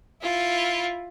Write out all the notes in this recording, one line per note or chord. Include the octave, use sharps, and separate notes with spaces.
E4 F4